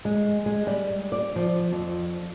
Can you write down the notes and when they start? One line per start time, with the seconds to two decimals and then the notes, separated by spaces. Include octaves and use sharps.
0.05 G#3
0.46 G#3
0.67 G3
1.12 D5
1.36 F3
1.72 F2